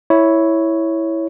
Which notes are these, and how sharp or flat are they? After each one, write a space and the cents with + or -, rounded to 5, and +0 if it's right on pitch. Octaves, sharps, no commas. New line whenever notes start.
E4 -5 C#5 +0